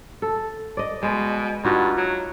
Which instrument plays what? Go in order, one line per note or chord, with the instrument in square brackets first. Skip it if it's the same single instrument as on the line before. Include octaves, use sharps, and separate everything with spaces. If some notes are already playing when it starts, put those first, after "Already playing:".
[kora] A4
D5 D#5
[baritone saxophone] B2 [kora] G#3
[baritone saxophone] G2 [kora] D#4 F4 F#4
[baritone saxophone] F#3